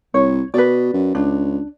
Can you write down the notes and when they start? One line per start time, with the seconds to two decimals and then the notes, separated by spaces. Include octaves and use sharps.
0.14 C2 C#5
0.54 B2 B4 D5
0.94 F#2
1.15 C#2 D4